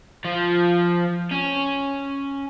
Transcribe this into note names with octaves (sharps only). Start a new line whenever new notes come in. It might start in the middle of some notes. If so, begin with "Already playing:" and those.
F3
C#4